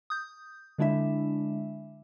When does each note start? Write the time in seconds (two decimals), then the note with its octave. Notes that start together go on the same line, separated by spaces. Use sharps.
0.10 D#6 G6
0.78 D3 G#3 D4 E4 E5